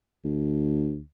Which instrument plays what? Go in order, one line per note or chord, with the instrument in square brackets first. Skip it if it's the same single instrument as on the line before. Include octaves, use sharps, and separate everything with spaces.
[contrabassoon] D2